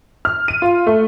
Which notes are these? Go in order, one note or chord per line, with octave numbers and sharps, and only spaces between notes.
F6
D#7
F4
A3